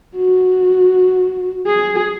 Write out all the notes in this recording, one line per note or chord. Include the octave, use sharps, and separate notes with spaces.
F#4
G#4